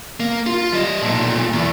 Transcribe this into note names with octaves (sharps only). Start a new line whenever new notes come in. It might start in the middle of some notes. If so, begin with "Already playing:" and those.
A#3
F4
G3 D#5
B1 A#2
E2